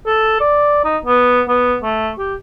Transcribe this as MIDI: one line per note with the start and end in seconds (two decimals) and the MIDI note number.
0.07 0.38 69
0.41 0.80 74
0.84 0.98 63
1.05 1.42 59
1.48 1.76 59
1.83 2.11 57
2.18 2.35 67